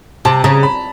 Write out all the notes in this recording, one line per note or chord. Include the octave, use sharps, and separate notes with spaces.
C3 A5
C#3 A#5
B5